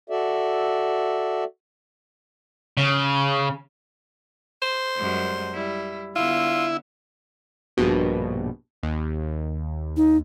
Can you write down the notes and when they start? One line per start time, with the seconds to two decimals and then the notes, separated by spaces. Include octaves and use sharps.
0.10 F#4 A4 D5 E5
2.77 C#3
4.62 C5
4.96 F#2 G3 G#3
5.53 G3 E4
6.16 D3 B3 E4 F4
7.77 A#1 G2 B2
8.83 D#2
9.97 D#4